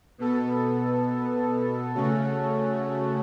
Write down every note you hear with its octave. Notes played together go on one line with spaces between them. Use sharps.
B2 B3 A4
C#3 A3 C#4 F#4 A4